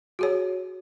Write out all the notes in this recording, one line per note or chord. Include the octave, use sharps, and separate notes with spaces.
F#4 G#4 C#5